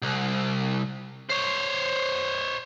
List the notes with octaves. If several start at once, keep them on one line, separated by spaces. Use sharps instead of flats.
C2
C5 C#5